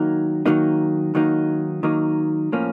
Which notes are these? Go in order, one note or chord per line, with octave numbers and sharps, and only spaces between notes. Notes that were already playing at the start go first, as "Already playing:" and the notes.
Already playing: D#3 F#3 A#3 D#4
D#3 F#3 A#3 D#4
D#3 F#3 A#3 D#4
D#3 F#3 A#3 D#4
A2 F3 A#3 C#4